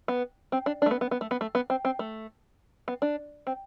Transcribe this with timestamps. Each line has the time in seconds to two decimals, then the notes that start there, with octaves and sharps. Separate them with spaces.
0.08 B3
0.52 C4
0.66 D4
0.82 D4
0.86 A3
0.91 B3
1.01 B3
1.11 B3
1.21 A3
1.31 B3
1.41 A3
1.55 B3
1.70 C4
1.85 C4
1.99 A3
2.88 B3
3.02 D4
3.47 C4